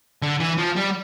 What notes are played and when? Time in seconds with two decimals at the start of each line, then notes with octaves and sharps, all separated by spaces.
0.22 D3
0.40 E3
0.58 F3
0.76 G3